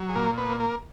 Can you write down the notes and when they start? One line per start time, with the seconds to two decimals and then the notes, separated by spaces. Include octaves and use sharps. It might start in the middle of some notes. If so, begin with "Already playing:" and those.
Already playing: F#3
0.09 G#4
0.15 A#2 A#3 A#4
0.38 B3 B4
0.49 A#3
0.60 A#3 A#4